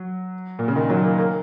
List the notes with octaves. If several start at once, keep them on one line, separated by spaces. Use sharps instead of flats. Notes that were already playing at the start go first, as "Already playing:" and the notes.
Already playing: F#3
A#2
C#3
D#3
F#3
A#3
A#3